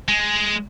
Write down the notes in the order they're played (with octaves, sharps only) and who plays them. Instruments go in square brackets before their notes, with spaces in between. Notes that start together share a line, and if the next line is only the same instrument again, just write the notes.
[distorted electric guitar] G#3